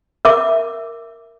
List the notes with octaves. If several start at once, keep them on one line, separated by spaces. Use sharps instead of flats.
A#4 E5 D6